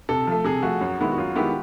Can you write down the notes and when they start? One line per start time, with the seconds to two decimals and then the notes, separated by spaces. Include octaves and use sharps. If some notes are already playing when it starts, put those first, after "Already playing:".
0.09 C3 A4
0.27 F3 A3
0.44 C3 G#4
0.62 F3 A3 F#4
0.81 F#2
0.99 D#3 G#3 B3 E4
1.12 F#4
1.18 F#2 F4
1.35 D#3 G#3 B3 E4 G4